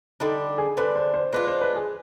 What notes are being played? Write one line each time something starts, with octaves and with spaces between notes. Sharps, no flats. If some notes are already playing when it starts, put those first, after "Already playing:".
D3 G3 D4 D#4
G#4
D3 G3 D4 B4
C5
C5
G#3 D4 F4 B4
C5
B4
G#4